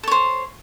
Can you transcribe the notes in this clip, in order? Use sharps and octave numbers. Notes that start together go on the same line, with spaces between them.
A4 C5 C#5